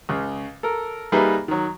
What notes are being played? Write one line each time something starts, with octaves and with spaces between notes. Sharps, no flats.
C#2 C#3
A4 A#4
G3 A#3 D#4 G#4 B4 E5
D#3 F#3